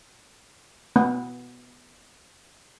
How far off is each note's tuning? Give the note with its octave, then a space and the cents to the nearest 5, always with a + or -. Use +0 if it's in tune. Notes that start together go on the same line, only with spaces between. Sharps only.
B3 +0